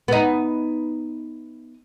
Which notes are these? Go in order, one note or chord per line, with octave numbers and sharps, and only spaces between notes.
B3 D#4